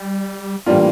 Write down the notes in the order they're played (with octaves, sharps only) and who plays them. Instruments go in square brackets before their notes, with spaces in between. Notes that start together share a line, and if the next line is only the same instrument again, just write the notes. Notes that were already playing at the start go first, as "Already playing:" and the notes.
Already playing: [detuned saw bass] G3
[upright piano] A2 E3 G3 D4 F4 [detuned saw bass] A#3